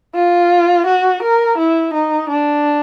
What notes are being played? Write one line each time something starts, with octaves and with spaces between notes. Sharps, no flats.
F4
F#4
A#4
E4
D#4
D4